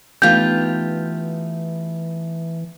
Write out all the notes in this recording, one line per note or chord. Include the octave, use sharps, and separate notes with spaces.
E3 A3 B3 D#4 F4 G4 G6